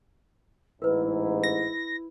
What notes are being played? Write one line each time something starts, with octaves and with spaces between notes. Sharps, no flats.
A1 G#2 E4 A#4 B4
A#6